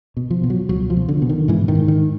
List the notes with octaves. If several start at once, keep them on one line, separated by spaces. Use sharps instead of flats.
B2
F3
B2
F#3
C#2 F#3
F3
B2
D3
B2
D#3
G#2 E3
D#3
G#2
D#3